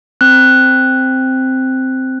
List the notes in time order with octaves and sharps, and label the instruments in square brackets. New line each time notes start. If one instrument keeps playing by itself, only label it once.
[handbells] C4 F#6